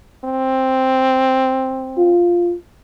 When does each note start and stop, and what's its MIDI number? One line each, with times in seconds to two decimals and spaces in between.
0.24 2.13 60
1.98 2.54 65